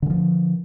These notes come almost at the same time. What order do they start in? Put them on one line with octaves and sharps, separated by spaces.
D3 E3 F3